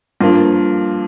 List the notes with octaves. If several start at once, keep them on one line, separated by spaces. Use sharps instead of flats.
G2 F3 A#3 F4